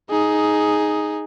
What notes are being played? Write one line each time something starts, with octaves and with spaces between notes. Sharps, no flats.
D#4 G#4